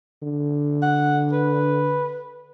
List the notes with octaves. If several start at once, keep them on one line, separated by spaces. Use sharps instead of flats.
D3
F#5
B4